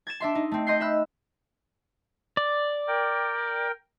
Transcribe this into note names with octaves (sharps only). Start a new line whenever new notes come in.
G#6 A6 E7
D4 E5 C6
D#4
A3 C4
D#5 C6 G6 C7
E5 B5 E6 F#6
D5
A#4 G5